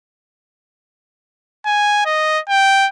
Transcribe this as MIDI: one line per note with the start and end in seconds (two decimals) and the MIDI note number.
1.65 2.01 80
2.06 2.39 75
2.49 2.87 79